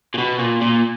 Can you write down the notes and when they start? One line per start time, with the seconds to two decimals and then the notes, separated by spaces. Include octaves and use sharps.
0.14 A#2
0.18 B2
0.39 A#2
0.62 A#2